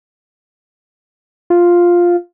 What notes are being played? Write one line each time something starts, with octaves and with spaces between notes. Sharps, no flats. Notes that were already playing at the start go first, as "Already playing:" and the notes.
F4